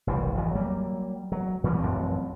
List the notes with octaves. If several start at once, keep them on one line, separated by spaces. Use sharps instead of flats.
F#1 C2 E3 G3
G#1 F2 B2 E3
F#3 G3 A#3
F#3
A#2 E3 G3 G#3
A1 F#2 F3 C4